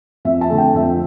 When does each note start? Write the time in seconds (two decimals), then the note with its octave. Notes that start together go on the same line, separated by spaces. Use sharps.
0.25 F2 E5
0.41 A5
0.50 D3 A3
0.58 G5
0.74 F2 E5